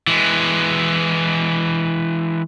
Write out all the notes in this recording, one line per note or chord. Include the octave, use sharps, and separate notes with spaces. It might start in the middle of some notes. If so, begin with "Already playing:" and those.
E3 G#3